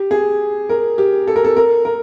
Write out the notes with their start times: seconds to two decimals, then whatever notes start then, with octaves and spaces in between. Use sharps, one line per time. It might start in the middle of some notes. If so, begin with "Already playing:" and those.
Already playing: G4
0.11 G#4
0.69 A#4
0.98 G4
1.27 A4
1.36 A#4
1.45 A4
1.57 A#4
1.85 A#4